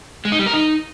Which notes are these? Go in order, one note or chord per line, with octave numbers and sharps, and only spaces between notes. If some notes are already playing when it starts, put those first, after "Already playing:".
G#3
D#4
G3
A#4
D#4